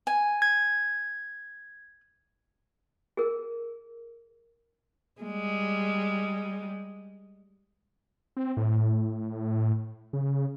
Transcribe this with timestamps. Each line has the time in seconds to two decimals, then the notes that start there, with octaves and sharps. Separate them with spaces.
0.07 G#5
0.42 G#6
3.17 G#4 A#4
5.22 G3 G#3
8.37 C4
8.57 A2
10.13 C#3